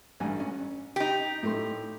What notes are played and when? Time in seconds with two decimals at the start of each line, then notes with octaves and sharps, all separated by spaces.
0.20 A1 G2 G#5
0.40 C#4
0.96 D#4 G4
1.43 A2 A3 C6